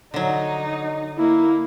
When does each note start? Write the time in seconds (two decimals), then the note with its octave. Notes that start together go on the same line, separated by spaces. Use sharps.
0.14 D3 F#3 D#4
1.18 A#3 E4